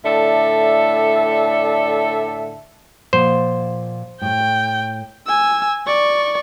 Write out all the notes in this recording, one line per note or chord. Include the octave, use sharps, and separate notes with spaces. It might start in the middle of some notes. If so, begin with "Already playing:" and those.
A2 D3 A4 D5 E5
A#2 F3 C5 F#5
A2 A3 G5
G#5 E6
D5 C#6